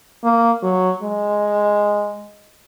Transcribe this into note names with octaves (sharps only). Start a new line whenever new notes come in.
A#3
F#3
G#3